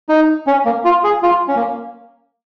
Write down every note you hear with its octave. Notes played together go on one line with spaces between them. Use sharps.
D#4
C#4
A#3
F4
G#4
F4
C#4
A#3